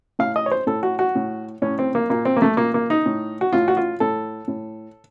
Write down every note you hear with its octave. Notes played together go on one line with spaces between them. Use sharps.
A2 F5
D#5
C#5
C5
A2 A4
F#4
F#4
A2
A2 C#4
C4
A#3
A#2 A#3
C4
A#3
A3
A#2 A#3
A#3
D#4
A2
F#4
A2 F4
F#4
F4
A2 A4
A2